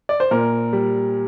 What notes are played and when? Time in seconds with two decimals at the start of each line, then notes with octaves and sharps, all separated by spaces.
0.09 D5
0.20 C5
0.31 A#2 A#4
0.73 G3